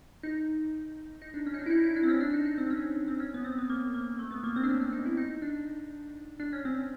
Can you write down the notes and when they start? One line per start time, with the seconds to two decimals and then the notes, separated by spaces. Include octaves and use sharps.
0.23 D#4
1.22 D#4
1.34 D4
1.47 C#4
1.54 D#4
1.59 D4
1.66 E4
1.71 D#4
1.84 E4
1.96 D4
2.03 C4
2.08 C#4
2.21 D4
2.33 D#4
2.46 D#4
2.58 C4
2.70 C#4
3.08 C4
3.20 C#4
3.34 B3
3.44 C4
3.59 B3
3.70 A#3
3.94 A#3
4.19 A3
4.31 B3
4.44 A#3
4.56 C4
4.63 D4
4.69 C#4
4.81 D4
4.92 D#4
5.06 E4
5.17 D#4
5.42 D4
6.40 D4
6.53 C#4
6.65 C4